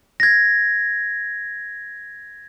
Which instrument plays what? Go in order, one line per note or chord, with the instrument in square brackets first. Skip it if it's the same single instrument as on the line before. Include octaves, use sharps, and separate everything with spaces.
[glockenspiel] G#6 A#6